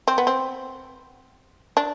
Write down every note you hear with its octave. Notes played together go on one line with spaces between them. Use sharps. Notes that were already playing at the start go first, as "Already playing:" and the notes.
C4
B3
C4
D4